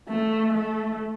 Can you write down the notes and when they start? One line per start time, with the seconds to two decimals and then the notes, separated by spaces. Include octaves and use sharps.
0.09 A3
0.54 A3